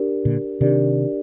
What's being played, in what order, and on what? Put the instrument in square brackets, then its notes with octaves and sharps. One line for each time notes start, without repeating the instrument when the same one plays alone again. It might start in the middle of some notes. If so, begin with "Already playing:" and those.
Already playing: [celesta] D4 G4 A#4 D5
[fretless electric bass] A#2 D3
[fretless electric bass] C3 D#3 [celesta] D4 G4 A#4 D5